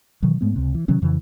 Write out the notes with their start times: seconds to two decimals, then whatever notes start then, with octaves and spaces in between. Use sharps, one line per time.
0.22 B2 D#3 E3 F#3
0.41 G#2 G#3 A3 B3
0.56 C#2 C3
0.74 E3
0.88 C3 D#3 F#3 C#4
1.02 F2 C#3 E3